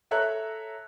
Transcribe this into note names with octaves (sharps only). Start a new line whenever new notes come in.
A4 C#5 E5 A#5 F#6